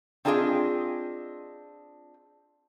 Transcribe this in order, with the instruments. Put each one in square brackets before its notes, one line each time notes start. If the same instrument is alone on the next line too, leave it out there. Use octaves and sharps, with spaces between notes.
[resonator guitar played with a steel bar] C4 D4 F4 G#4 D5 D#5